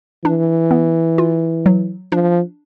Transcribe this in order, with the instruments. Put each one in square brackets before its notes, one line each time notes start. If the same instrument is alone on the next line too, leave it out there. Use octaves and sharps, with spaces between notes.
[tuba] E3 [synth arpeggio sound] D4
[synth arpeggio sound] B3
F4
F#3
[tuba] F3 [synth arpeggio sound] D4